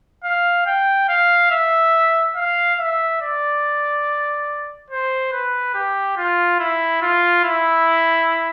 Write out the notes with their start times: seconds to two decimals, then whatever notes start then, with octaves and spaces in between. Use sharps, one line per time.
0.24 F5
0.66 G5
1.09 F5
1.51 E5
2.36 F5
2.79 E5
3.21 D5
4.90 C5
5.32 B4
5.74 G4
6.17 F4
6.59 E4
7.02 F4
7.44 E4